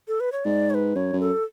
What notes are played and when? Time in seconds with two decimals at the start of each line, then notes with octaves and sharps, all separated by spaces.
0.08 A4
0.20 B4
0.32 C#5
0.45 G#2 D5
0.70 C#5
0.74 B4
0.95 F#2 C#5
1.13 F#2
1.21 A4